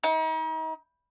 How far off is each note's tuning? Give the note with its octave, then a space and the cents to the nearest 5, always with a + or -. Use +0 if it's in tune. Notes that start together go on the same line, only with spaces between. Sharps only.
D#4 +40